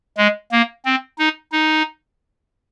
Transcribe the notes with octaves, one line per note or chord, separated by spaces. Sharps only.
G#3
A#3
C4
D#4
D#4